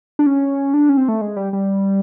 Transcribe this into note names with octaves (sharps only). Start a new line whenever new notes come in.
D4
C#4
D4
C#4
C4
A3
G#3
G3
G3